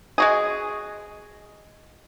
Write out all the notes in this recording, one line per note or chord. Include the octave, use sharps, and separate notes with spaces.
G#3 F#4 G#4